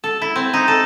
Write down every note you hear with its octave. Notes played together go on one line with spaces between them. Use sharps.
A4
E4
C4
D#4
A4